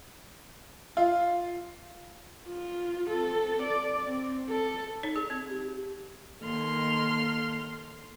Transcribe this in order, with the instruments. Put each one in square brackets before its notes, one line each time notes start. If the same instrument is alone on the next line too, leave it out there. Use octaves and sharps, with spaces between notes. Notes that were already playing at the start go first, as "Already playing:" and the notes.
[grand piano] F4
[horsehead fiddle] F4
C4 A4
D5
C4
A4
[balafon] D#4 C#5
G#4
C4
[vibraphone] G4
[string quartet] D#2 D#3 A4 C6 F6